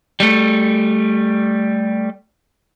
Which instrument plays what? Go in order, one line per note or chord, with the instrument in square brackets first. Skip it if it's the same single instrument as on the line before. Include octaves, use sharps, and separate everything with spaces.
[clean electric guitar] G3 A3